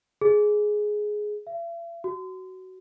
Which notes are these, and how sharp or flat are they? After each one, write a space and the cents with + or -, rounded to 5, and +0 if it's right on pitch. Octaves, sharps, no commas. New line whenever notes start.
G#4 +10
E5 +45
F#4 +15